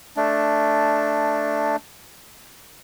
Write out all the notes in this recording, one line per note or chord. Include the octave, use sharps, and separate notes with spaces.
A3 D4